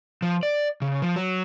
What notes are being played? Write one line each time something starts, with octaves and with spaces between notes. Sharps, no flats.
F3
D5
C#3
F3
F#3